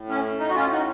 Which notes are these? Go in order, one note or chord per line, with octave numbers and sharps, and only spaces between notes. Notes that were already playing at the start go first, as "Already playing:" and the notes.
Already playing: A2
C#4
D#4
F#4
C#4 F4
D#4 F#4